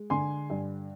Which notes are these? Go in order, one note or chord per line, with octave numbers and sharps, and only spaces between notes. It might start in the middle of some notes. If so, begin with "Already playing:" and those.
Already playing: G#3
D3 G#5 C6
G2